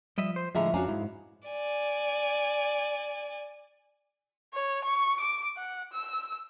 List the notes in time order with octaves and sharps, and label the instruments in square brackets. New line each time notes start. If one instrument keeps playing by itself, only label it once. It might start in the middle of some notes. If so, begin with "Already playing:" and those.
[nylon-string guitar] F3 [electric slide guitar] G3 D#5 E5
[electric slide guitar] C5
[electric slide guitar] A2 D3 F3 [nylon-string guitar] G#3 G#4 [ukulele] D#5 E5 A#5
[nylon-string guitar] F2 C#4 G#5 [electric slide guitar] D4 [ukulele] F#4 F5 A#5
[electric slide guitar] G#2 [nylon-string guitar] G#3 E4
[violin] D5 G#5
[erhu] C#5
C#6
D6
F#5
E6